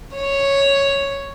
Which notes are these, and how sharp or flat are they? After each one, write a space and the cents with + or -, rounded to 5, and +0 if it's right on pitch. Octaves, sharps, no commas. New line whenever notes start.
C#5 +0